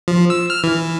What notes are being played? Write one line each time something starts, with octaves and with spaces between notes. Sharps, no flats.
F3
E6
F6
E3